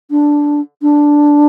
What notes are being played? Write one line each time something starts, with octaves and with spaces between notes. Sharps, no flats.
D4
D4